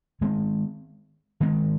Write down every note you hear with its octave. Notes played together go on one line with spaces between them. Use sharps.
D#3 G#3 C4
D#3 G#3 C4